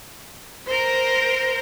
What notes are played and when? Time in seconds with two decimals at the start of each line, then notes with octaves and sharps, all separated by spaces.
0.67 A#4 C5